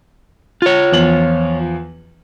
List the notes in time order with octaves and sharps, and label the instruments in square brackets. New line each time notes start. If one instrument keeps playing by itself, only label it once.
[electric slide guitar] F4 C#5
[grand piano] E2 F3 F#7